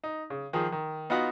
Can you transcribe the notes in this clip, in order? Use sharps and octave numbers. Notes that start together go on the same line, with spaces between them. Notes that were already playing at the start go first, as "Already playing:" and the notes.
D#4
C#3
D#3 F3 G#4
D#3
B3 D#4 F4 F#4 F#5 B5